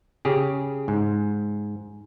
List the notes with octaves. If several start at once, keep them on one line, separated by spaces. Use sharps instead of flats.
C#3 G4 G#4
G#2